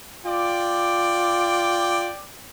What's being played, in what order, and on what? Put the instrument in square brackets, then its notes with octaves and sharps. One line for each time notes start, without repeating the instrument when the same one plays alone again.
[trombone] F4 [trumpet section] D5 G5 D6